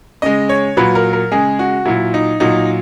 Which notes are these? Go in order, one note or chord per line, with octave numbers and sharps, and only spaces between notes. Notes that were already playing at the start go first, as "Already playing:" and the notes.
C#3 G#3 D#5
C#5
A#2 F#3 B4
A#4
A#4
C#3 G#3 G#4
F#4
A#2 F#3 E4
D#4
A#2 F#3 D#4